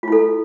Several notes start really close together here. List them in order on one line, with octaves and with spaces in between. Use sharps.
F4 E4 A4